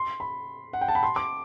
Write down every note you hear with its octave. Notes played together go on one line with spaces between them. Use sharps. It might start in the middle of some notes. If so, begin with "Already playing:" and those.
Already playing: C6
B5
F#5
G5
A5
B5
C6
D6